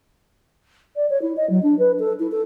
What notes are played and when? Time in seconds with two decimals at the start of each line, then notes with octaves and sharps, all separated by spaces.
0.96 D5
1.10 C#5
1.22 E4
1.37 D#5
1.50 F#3
1.63 D4
1.79 B4
1.99 A4
2.20 E4
2.32 A4